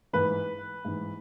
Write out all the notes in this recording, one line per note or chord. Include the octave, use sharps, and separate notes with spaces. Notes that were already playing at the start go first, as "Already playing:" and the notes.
G#2 E3 B4
G#2 E3